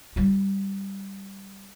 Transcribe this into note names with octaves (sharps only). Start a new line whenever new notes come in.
G3 F4